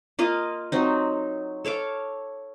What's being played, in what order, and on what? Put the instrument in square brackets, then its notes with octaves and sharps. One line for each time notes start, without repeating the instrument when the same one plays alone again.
[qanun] A#3 F4 D#5 F5
F#3 C4 D#4
A4 C#5 F5 D6